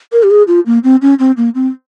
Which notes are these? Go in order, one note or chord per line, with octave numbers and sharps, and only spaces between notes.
A#4
G4
G#4
F4
A#3
C4
C#4
C4
A#3
C4